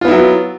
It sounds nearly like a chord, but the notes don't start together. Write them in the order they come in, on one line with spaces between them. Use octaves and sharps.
F4 B3 E4 F#3